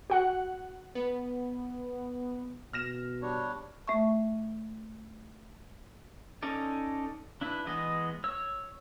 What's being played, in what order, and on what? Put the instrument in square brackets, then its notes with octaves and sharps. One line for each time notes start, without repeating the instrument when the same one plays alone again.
[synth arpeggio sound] F#4 F#5
[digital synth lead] B3
[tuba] B2 [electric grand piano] F6 A#6 E7
[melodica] G3 D4 C#5
[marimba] A3 E5 C#6
[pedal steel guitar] C#4 D#4 A4 D5
D4 E4 B4
E3 G#3 B3 D#5
C#5 E6